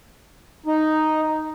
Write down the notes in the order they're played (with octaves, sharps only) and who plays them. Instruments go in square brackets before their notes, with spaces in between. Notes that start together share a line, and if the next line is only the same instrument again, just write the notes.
[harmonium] D#4